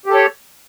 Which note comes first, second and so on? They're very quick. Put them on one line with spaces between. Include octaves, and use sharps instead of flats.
G4 A4 C#5